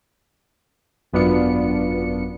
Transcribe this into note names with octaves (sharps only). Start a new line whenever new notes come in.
G#1 F#2 B3 D4 F4 C#7